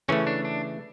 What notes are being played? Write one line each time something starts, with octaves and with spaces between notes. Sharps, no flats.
C#3 E3 A3 C#4
D4
D4